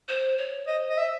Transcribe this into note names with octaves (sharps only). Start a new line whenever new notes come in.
C5
C#5
C5 D#5
D#5
E5